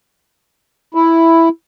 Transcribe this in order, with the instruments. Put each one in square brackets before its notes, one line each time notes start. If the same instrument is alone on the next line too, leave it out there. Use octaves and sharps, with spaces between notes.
[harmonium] E4